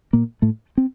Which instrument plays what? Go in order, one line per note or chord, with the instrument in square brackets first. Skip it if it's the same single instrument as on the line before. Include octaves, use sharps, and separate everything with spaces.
[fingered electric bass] A#2 A#3
A2 A3
C4